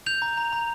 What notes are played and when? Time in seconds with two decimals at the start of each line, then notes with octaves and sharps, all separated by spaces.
0.06 G6 F7
0.22 A#5
0.37 A#5
0.53 A#5